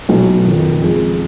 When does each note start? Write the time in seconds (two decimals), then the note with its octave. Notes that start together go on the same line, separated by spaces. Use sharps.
0.09 B1 B2 F#3
0.45 F#1 F2 D#3
0.81 F2 F3 G#3